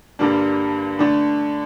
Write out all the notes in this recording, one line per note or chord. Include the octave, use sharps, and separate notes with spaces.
G2 D3 G3 A#3 D4
D3 A3 D4